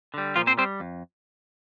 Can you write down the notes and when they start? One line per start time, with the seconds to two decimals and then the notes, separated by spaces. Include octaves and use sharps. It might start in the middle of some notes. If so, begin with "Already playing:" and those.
0.14 D3 G3
0.36 A#2 F3 F4
0.47 C4 C5
0.58 G3 C4 C5
0.80 F2